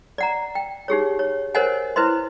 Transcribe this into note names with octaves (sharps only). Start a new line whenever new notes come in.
D5 F#5 A#5
G5
D#4 G4 G#4 C#5
C#5
A#4 C5 C#5 D#5 F#5 G#5
E4 B4 C5 D#5 C6